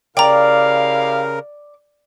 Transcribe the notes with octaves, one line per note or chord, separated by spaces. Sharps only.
C#3 E4 G4 A#4 D5 F5 G5 A#5